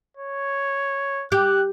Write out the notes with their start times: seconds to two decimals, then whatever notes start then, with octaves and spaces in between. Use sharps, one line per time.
0.17 C#5
1.32 G4 F#6